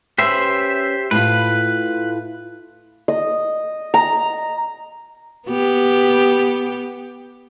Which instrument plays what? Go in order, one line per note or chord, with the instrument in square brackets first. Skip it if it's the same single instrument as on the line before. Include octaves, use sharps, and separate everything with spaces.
[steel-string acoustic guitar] C#4 B4 [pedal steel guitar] G4 C5 E5
[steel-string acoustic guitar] A2 F4 [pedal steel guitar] B4
[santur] D#5
A#5
[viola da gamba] B3 G4